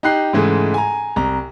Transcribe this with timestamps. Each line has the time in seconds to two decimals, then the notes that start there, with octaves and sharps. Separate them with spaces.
0.03 D#4 G4 F#6 C7
0.33 G#2 C#3 E3 G#3 A3
0.74 G#5 A#5
1.16 C2 A#5